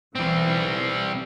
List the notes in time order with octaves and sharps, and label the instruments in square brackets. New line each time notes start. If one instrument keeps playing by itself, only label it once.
[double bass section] B1 E3 [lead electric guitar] G3 C4